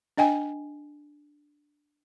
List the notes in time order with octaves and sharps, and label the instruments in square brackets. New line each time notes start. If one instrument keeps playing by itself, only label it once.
[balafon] D4 D#5 G5 G#5